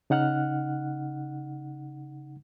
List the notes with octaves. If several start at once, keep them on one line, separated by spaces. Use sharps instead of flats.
C#3 D#4 F#5 F6 F#6